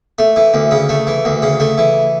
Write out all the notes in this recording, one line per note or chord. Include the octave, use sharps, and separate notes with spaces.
A3
E3
D2
C#3
A3
E3
D2
C#3
A3
E3